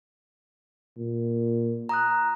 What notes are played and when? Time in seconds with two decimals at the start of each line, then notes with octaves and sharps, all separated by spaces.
0.98 A#2
1.89 A#5 D#6 F#6